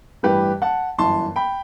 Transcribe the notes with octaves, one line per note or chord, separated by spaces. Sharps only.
A1 G2 E3 G3 G4 B4
F#5 A5
G1 F#2 E3 A5 C6
G5 B5